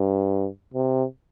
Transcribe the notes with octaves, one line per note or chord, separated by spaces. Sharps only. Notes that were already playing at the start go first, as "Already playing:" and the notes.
Already playing: G2
C3